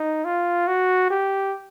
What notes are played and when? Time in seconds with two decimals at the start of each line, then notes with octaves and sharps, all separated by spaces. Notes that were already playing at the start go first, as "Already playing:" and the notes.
Already playing: D#4
0.25 F4
0.67 F#4
1.10 G4